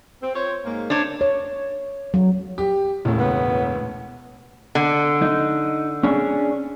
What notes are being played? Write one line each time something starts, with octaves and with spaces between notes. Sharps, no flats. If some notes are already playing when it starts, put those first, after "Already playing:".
C4
F4 C5 C#5
G#2 A#3
C4 D4 A#4 C5 C#5
C#5
F#3
G4
E1 C#2 A2
B3
D3
D#4
C#4 D4 G#4